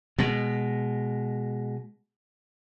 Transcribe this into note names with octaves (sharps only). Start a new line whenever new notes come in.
B2 G#3